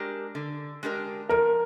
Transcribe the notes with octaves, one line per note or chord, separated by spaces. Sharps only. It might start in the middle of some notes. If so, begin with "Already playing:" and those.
Already playing: G#3 D4 G4 A#4
D3
G#3 D4 G4 A#4
F3 A#4